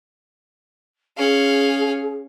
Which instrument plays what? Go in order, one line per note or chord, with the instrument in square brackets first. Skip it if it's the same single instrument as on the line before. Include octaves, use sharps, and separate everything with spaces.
[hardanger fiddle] C#4 F5 [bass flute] G#4